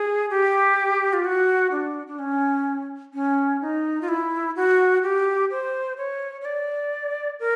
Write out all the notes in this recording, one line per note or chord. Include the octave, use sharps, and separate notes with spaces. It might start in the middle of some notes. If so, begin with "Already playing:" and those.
Already playing: G#4
G4
F4
F#4
D4
D4
C#4
C#4
D#4
F4
E4
F#4
G4
C5
C#5
C#5
D5
A#4